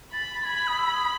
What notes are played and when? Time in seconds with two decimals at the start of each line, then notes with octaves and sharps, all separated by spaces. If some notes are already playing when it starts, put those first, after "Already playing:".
0.12 B5 A6
0.34 A6
0.45 B5 G#6
0.67 D#6
0.78 E6
0.94 D#6